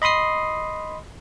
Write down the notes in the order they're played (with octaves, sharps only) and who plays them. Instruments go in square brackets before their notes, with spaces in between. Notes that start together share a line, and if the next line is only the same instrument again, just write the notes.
[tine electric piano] D#5 B5 C6 D#6 C7